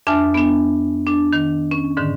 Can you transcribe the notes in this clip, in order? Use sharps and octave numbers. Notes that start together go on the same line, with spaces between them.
F2 D4 E5 G#5 F6
B3 D4
D4
D#3
C#4
G#2 D3 D#3